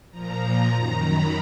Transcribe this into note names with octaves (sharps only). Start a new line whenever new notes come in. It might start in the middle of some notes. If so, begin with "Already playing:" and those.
A#2 F3 A#5
F#2 D#3
B5